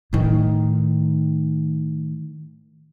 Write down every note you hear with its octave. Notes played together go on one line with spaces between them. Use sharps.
A2 D#3